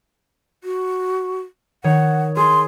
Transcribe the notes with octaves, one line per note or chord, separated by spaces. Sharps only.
F#4
D#3 C#5 F#5
G#4 C6